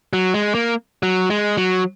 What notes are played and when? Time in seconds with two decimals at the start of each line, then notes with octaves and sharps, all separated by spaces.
0.13 F#3
0.34 G#3
0.55 A#3
1.03 F#3
1.30 G#3
1.57 F#3